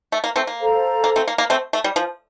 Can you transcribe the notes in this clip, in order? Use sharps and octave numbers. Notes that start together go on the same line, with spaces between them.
A3
A#3
A3 C4
A#3
A4 C5 F5 A#5
A#3
A3 C4
A#3
A#3
A3 C4
A3
G3
F3